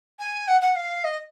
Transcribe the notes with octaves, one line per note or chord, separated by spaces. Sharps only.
G#5
F#5
F#5
F5
D#5